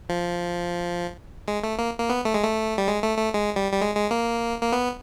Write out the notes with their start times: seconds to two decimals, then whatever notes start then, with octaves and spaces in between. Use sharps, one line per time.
0.09 F3
1.48 G#3
1.64 A3
1.79 A#3
1.99 A#3
2.10 B3
2.25 A3
2.34 G#3
2.43 A3
2.78 G3
2.88 G#3
3.03 A3
3.18 A3
3.34 G#3
3.56 G3
3.72 G3
3.80 G#3
3.96 G#3
4.11 A#3
4.61 A#3
4.72 B3